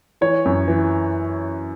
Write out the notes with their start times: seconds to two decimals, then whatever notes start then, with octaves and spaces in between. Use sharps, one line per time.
0.21 E3 C#5
0.45 F#2
0.68 E3